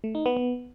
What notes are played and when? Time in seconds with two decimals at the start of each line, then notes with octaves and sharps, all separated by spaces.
0.04 A3
0.15 D#4
0.26 B3
0.37 B3